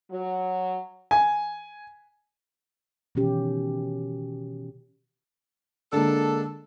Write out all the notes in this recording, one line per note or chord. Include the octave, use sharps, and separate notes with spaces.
F#3
G#5
B2 D#3 E3 C#4 G4
D3 G#3 A#3 D4 A4